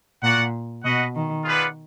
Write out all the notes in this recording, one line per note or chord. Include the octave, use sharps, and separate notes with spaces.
A#2 F#4 D5 F#5
B2 F#4 B4 D#5 F#5
D#3
F4 G#4 B4 D5 F#5